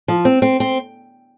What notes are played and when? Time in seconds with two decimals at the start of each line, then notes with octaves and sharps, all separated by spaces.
0.08 F3
0.25 C4
0.42 C4
0.60 C4